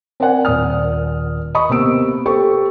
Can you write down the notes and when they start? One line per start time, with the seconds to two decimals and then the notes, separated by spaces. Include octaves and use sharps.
0.20 C4 A#4 C5 D5 F#5 G#5
0.45 D#1 D5 D#6 F6
1.55 D#5 B5 C#6 D#6
1.70 C3 A#3 B3 E6 D7
2.26 G4 A4 C5 C#6